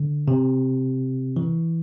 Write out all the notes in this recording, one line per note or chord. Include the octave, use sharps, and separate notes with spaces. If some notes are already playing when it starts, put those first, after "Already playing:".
Already playing: D3
C3
E3